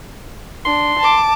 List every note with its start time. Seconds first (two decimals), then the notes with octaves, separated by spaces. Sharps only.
0.65 D4 C6
0.99 A5 D6